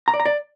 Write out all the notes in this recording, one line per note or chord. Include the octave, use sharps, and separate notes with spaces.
A#5
D5
A#5
D5